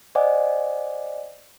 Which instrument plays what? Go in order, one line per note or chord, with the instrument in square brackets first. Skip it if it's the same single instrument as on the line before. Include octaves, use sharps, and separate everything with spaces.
[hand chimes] C5 D5 D#5 F#5 G#5 D6